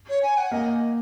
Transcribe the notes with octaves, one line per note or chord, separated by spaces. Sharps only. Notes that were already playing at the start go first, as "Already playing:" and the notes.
C#5
G#5
F#5
A#3 D#5